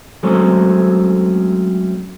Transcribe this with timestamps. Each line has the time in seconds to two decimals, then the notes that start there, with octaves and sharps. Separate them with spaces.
0.23 F#3 G#3 A3 C4 C#4